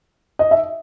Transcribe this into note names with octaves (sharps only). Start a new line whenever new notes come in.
D#5
E5